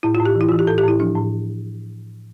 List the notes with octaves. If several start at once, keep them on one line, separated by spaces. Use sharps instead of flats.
A2 E4
F4
A2
G4
E3
E4
E3 F4
G4
A2 A4
G4
A2 E4
F3 D4
A2